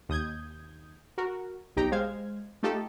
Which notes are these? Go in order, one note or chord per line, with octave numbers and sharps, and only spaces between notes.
D#2 D#6 G6 G#6
F#4 A#4
B1 D#4 G4 G5 A#5
G#3 C5 F5 G#6
A3 D#4 F4 G4 A4